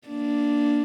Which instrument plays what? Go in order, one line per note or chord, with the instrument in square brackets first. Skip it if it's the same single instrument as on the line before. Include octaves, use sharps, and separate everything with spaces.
[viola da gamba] A#3 D4